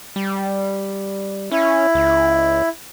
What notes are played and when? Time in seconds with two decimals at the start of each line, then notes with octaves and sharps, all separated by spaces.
0.16 G3
1.52 C#4 E4
1.95 C#2